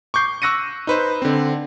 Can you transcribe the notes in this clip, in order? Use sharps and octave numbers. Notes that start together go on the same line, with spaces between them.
C#6 D6 G6 C7
C#6 E6 F#6 A#6 C#7 D#7
D#4 B4 C5
D3 C4